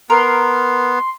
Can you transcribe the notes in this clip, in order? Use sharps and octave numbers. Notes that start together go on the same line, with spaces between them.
B3 A#4 C6